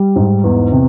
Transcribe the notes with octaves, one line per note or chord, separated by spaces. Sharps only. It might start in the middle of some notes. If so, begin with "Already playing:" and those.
Already playing: G3
G#2
E2
C3